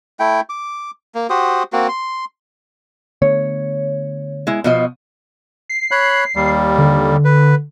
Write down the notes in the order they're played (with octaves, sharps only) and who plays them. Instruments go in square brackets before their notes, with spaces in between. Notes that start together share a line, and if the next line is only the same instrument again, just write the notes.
[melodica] A3 E4 G5
D6
A#3
F#4 G4 C5 D#6
A#3 C4 F#4
C6
[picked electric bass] D3 A3 B3 [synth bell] C#5
[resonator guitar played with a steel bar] G#3 E4
B2 F3 D#5
[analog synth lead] C7
[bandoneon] C#5 B5 F#6
D#2 G3
[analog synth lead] D3
[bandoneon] B4